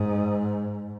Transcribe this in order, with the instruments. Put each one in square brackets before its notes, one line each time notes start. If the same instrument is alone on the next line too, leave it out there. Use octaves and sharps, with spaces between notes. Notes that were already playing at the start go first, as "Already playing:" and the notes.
Already playing: [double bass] G#2